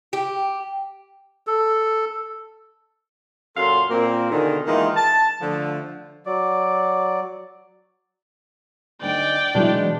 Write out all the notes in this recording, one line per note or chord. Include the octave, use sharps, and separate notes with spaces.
G4
A4
F#2 A#2 A4 F5 C6
A#2 A#3 C4
B2 D3 D#3 F4 G#4
D#3 E3 G#3 A#3 D#4 F4
A5
D3 F3 A3
F#3 D5
D2 D4 D#4 D5 G5
B2 E3 F#3 G#3 D4 D#4